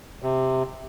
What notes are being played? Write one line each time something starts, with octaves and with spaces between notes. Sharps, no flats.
C3